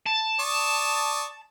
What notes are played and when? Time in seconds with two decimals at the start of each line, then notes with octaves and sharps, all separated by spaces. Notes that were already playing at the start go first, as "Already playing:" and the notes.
0.07 A5
0.40 D5 C#6 D#6